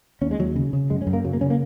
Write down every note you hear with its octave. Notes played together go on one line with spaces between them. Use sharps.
D#2 C#4
G#3
D#2 F#3
C#3
C#3
F#2 G#3
C#4
F#2
A#3
C#3 F#3
A#3
C#3 C#4
A#3